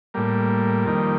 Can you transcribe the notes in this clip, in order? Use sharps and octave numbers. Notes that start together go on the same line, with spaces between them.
A2 G3 A#3
F2 D#3 G3